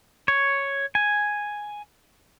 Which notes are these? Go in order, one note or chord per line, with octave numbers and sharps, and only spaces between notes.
C#5
G#5